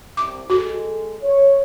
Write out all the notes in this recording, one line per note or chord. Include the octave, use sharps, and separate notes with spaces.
C2 C3 D6
G#3 F#4 A4
C#5